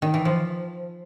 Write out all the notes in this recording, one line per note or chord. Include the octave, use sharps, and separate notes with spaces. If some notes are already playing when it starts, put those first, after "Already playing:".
D#3
E3
F3